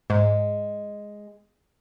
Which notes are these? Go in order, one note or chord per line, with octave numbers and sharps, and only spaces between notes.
G#2 G#3